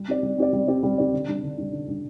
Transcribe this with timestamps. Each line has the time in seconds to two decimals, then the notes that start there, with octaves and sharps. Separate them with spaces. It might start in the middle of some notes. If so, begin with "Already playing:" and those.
Already playing: G3
0.08 C4 G4 D5
0.23 G3
0.38 C4 G4 D5
0.53 G3
0.68 C4 G4 D5
0.83 G3
0.98 C4 G4 D5
1.13 D3
1.28 G3 D4
1.43 D3
1.58 G3 D4
1.73 D3
1.88 G3 D4